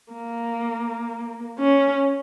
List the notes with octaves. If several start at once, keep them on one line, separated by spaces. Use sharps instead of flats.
A#3
C#4